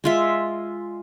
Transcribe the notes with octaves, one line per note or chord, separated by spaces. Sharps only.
G#3 F4 E5